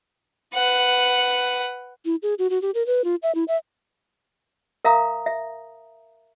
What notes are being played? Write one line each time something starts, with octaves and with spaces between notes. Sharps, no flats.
B4 F#5
E4
G#4
F#4
F#4
G4
A#4
B4
F4
E5
E4
E5
A#4 E5 F5 A#5 D#6
E5